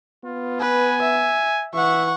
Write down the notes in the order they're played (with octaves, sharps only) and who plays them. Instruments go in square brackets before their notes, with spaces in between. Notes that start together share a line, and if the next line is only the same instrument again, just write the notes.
[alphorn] B3 [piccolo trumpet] F4
[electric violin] B4 [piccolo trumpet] G#5
[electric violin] E5
[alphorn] E3 [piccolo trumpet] E5 [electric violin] F#5 C#6